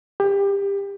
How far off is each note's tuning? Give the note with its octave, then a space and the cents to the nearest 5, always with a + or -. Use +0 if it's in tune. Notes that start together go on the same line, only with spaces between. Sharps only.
G4 +25